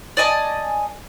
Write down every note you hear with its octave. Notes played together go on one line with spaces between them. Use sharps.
D5 D#5 G#5 A5